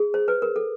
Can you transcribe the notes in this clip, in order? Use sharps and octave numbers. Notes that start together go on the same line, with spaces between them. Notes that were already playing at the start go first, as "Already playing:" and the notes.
Already playing: G#4
C5
B4
A#4
A4